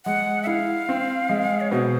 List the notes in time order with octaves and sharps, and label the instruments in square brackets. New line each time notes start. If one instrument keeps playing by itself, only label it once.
[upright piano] G#3 [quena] F#5
[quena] E5
[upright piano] E4 [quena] F5
[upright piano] C4
G#3
[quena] C#5
[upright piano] B2 [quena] C5